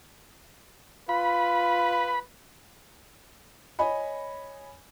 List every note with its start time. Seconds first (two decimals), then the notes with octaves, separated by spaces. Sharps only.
1.09 F4 B4 B5
3.79 C#5 D#5 G#5 B5